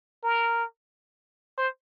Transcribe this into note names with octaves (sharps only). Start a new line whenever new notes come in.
A#4
C5